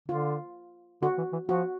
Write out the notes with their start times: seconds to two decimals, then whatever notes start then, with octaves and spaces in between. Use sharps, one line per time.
0.09 D3 F4
1.02 D3 F#4
1.18 E3
1.33 E3
1.48 F3 F#4